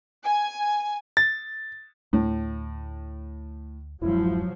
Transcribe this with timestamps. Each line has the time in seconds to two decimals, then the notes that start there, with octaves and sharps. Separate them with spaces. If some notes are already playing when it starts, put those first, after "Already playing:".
0.24 G#5
1.17 A6
2.13 D2 A2
4.01 D1 F#2 F3 F#3 G#3 E4